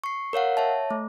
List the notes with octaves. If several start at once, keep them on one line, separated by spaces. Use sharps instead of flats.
C#6 C7
A#4 C#5 F5 F#5
C#5 E5 A5
A3